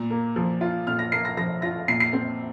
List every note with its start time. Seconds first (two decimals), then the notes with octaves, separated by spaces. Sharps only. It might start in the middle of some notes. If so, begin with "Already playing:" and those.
Already playing: A#2
0.10 A#3
0.36 F3
0.61 F4
0.87 A#2 F6
0.99 A#6
1.12 A#3 C7
1.25 A#6
1.37 F3 A#6
1.62 F4 A#6
1.88 A#2 C7
2.00 C7
2.13 C4